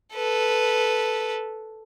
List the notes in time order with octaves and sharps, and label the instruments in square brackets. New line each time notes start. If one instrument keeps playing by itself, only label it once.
[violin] A4 B4